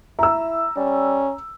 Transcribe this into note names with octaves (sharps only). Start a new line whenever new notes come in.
E4 A#5 E6
G3 C#4